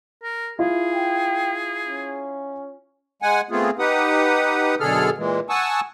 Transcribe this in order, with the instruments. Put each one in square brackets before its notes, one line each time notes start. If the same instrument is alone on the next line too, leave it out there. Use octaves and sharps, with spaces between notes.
[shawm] A#4
[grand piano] E4 F4 [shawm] G#4
[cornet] G5
C#4
[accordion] G#3 F#5 G#5
A3 B3 C4 F4 G#4
D#4 G4 B4 F#5 D#6
F#2 B2 D3 G#4 A4 F6
A#2 E3 G#3
F#5 G#5 A5 C#6 D#6 E6